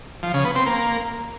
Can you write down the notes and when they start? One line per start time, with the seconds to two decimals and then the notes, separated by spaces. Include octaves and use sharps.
0.23 F3
0.34 C#3
0.45 B3
0.55 C4
0.66 A#3